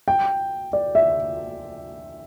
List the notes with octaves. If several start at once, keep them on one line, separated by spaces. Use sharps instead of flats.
G5
D5
E5